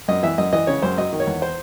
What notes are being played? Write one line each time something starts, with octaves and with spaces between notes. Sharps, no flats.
F#2 D#5
E3 E5
F#2 D#5
E3 D#5
C#3 C#5
F#2 C5
F#3 D#5
D#3
C#5
E2
C5